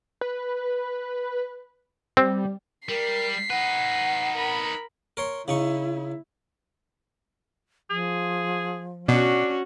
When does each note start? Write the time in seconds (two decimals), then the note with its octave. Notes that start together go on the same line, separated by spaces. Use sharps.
0.21 B4
2.17 G3 C4
2.89 G3 A#4 B6 C7
3.50 D#4 B4 F#5
4.36 A#4 B5
5.17 A#4 C#5 C6
5.48 C#3 D#4 E4 C#6
7.90 F3 G#4
9.08 B2 C#4 D4 F#4